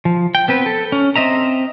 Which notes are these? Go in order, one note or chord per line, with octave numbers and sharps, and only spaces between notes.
F3
G5
B3 C4 B4
A4
C#4
C4 D#5 E5 A#5